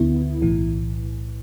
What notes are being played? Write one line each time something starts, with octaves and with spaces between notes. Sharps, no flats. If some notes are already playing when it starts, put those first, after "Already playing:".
Already playing: D2 D3 B3 E4
B1 A2 E3